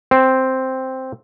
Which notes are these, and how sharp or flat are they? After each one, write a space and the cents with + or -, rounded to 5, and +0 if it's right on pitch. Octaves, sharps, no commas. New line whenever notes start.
C4 +0